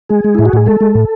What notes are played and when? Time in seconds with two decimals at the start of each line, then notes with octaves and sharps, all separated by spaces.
0.09 G#3 G#4
0.24 G#3
0.35 A2 E4
0.45 F#4
0.53 A2 G#4
0.66 G#3 A4
0.81 G#3
0.95 A2